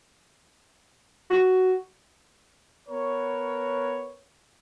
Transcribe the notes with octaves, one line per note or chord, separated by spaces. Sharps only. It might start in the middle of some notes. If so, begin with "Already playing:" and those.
F#4
B3 A#4 B4 C#5